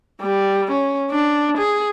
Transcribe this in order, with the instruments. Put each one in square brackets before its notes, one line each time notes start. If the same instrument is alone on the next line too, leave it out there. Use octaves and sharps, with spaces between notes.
[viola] G3
C#4
D4
G#4